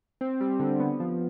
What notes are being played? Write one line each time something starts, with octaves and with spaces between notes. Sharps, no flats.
C4
G3
D3
B3
F3